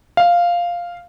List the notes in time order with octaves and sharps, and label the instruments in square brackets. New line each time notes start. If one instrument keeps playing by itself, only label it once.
[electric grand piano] F5